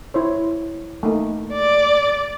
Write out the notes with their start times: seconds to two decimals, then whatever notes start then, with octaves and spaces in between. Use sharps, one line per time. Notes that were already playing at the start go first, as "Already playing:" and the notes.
0.14 E4 C5 C#5
1.03 A3 A#3 D#4
1.53 D5